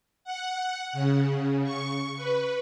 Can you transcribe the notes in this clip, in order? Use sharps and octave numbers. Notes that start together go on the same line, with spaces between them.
F#5
C#3
C#6
B4